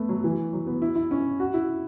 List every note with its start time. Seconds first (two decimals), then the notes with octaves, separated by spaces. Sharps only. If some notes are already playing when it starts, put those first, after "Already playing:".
Already playing: A3 B3
0.09 F#3
0.24 E3
0.53 F#3
0.67 B3
0.82 E4
0.96 E4
1.11 C#4
1.40 F#4
1.54 E4